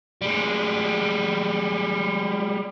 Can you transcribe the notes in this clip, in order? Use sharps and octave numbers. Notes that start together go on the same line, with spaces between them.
G3 G#3